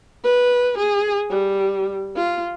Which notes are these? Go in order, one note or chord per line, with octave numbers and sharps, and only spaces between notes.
B4
G#4
G3
F4